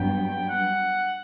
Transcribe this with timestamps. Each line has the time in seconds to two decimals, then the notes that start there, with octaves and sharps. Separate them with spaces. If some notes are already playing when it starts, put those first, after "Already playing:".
Already playing: G2 F#3 B3 G5
0.49 F#5